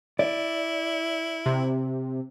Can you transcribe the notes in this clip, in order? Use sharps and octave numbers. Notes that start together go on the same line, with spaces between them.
E4 D5
C3